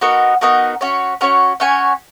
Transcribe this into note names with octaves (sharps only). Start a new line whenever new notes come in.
B3 D#4 F#4 A#4
B3 D#4 F#4 A#4
C#4 F#4 C#5
C#4 F#4 C#5
C#4 F#4 C#5 G#5